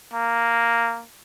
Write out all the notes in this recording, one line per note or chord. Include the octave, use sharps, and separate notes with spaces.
A#3